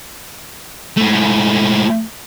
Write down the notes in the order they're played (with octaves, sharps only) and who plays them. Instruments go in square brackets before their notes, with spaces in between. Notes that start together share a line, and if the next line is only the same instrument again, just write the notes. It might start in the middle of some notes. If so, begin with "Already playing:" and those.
[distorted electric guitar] G#2 A3